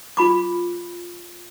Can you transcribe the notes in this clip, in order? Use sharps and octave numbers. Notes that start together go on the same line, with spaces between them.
F4 B5 D6